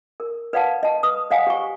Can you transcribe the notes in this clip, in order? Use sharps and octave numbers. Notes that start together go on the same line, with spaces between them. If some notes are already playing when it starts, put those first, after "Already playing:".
A#4
B4 D5 F5 F#5 A5
D#5 A5
B4 D#6
C5 D#5 F5 F#5 G#5
G4 C5 C#6